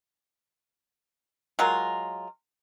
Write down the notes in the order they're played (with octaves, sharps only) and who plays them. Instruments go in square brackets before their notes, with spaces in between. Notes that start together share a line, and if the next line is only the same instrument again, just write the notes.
[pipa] F#3 G#3 F4 A#4